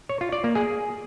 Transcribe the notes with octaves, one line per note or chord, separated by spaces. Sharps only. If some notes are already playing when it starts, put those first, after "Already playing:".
C#5
F4
D5
A#3
G#4